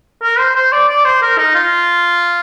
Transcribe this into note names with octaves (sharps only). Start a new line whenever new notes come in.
A#4
C5
C5
D5
D5
C5
A#4
D#4
F4